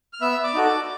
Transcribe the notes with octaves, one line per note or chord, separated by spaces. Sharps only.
F6
B3 E5 E6
D5 D6
D#4 F#4 A4
D5 D6